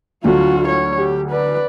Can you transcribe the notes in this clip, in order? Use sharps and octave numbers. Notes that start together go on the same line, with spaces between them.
D2 F#3 D4 F4 F#4
C#5
G4
B4 D5